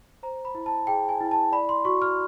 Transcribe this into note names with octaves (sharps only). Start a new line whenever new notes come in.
C5 A#5
B5
E4
A5
G#4 G5
G#5
E4
A5
D5 B5
C6
F#4 C#6
F6